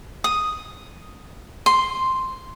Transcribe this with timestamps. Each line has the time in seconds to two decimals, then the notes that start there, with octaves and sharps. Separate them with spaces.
0.24 D#6
1.66 C6